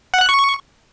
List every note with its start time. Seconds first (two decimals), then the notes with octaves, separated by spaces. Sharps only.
0.14 F#5
0.21 F#6
0.29 C#6